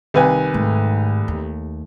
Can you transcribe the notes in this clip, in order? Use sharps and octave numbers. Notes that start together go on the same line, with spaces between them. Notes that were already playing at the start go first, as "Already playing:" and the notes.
C2 D#3 B4 G#5
G#2 A3
D#2